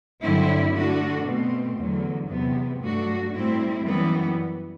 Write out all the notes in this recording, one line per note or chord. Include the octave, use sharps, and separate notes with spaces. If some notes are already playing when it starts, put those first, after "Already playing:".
G2 D3 F#3 C4 E4
D3 A3 D4 F#4
B2 A3 C4
E2 D3 F#3
E2 C3 F#3 B3
G2 F#3 A3 D4 F#4
A2 G3 C4 E4
F#2 E3 G3 B3